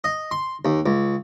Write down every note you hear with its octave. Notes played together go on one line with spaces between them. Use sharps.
D#5
C6
D#2
C#2